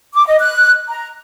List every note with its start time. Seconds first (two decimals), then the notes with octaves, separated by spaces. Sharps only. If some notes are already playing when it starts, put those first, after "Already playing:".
0.14 D6
0.26 D#5
0.40 F#6
0.89 A#5